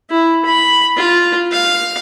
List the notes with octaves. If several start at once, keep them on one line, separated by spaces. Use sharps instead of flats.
E4
B5
F4
F5